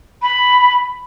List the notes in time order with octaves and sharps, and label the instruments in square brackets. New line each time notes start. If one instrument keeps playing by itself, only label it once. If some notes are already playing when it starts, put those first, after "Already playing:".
[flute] B5